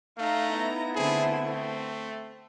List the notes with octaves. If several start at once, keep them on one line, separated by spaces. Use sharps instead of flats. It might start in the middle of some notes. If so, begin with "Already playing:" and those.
A3 D#4 F5 A#5
B3 E4
D3 A3 C4 G#4
A3 C4